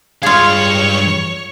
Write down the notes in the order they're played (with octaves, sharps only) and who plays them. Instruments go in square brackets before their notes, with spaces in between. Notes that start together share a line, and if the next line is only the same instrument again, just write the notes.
[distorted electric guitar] G2 F5 [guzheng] F4 G#4 [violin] C#5 C#6